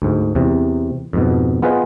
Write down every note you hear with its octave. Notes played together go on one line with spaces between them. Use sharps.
D2 G#2
E2 C3
F2 G#2 B2
B3 F4 G#4 B4 C5 D#5